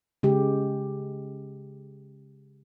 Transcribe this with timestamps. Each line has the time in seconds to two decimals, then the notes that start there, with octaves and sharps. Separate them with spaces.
0.23 C#3 G#3 G4